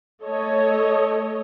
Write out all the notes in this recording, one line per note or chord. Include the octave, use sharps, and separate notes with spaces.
A3 A4 C#5 D#5